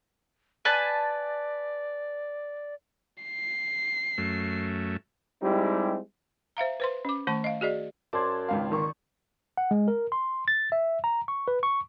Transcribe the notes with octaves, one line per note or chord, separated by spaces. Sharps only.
B4 D5 G#5 A5
C7
F#2 A3
G3 G#3 C4 D#4 E4 G4
C5 E5 F5 A#5
B4 C5 C6
C#4 D6
D#3 A3 A5 C#6
D#5 F5
F#4 G#4 D5 D#5
F#2 C5 D5 A5 G#6
G#1 C#2 F5
D#3 A#3 C#6
F#5
G#3
A#4
C6
A6
E5
A#5
C#6
B4
C#6